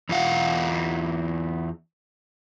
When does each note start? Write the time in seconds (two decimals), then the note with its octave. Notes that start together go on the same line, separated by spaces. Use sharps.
0.09 E2 F4 F5 F#5